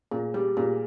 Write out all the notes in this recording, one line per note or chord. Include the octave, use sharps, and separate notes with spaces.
A#2 G#4
G3 G4
A#2 G#4